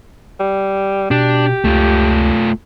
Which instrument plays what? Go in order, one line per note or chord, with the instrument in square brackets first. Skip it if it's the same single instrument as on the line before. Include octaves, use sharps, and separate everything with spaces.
[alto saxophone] G3
[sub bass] B2 [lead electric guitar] D4 [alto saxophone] G4
[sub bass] C#2 [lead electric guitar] A3 F4